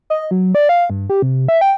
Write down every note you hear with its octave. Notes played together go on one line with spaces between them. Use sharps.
D#5
F#3
D5
F5
G2
G4
C3
E5
G5